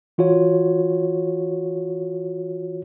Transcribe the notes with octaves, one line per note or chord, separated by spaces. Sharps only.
E3 F4 F#4 C#5